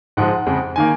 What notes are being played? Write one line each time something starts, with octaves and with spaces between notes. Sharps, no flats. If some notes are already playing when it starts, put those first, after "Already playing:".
G#2 F3 G#3 F#5
F2 C#3 G#3
D#3 A#3 G#5